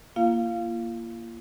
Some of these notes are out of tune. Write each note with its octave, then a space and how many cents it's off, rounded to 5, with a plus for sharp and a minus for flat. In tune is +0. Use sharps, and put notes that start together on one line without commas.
A#3 +0 F4 -40 F5 +0